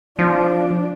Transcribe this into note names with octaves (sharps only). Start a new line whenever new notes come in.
F3 D4